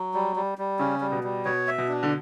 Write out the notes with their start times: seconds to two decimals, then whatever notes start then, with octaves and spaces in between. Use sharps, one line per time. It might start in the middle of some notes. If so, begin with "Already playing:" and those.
Already playing: F#3
0.14 G3
0.36 G3
0.58 G3
0.79 C#3 C#4
1.01 G3
1.12 B2
1.24 G3
1.45 B2 C#5
1.67 E5
1.78 B2
1.88 D4
2.03 D3